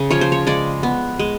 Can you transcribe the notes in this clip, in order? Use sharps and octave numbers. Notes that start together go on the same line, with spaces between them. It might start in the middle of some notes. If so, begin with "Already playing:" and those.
Already playing: C#3
F3 C#5
C5
C#5
G#3 D5
B3
G#3